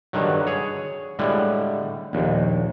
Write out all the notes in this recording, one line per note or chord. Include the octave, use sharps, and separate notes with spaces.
G2 D3 D#3 F#3
G#4 C#5
A2 D3 G3 G#3
A#1 D#2